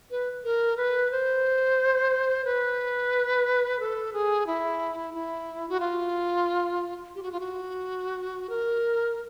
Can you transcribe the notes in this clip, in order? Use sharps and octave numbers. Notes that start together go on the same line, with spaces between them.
B4
A#4
B4
C5
B4
A4
G#4
E4
E4
F#4
F4
G4
F#4
F4
F#4
A#4